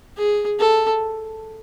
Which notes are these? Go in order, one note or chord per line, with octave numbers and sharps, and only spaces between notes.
G#4
A4